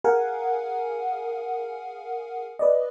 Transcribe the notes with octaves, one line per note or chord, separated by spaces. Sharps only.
G#4 A#4 F5 F#5 G#5
B4 D5 D#5